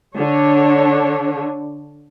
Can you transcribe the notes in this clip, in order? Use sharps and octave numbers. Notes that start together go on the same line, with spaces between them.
D3 D4 C#5